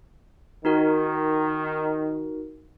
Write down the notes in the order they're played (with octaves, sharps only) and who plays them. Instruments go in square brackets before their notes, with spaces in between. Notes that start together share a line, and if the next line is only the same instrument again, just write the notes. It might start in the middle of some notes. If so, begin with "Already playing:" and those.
[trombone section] D#3 [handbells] D#4 F#4 A#4